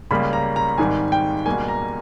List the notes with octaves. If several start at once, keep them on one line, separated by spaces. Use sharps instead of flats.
C#2 C#3 G3 A#3 B5
A#5
A#5
G#1 G#2 D#3 G3 G#5
G5
C#2 B2 G3 A#3 G#5
A#5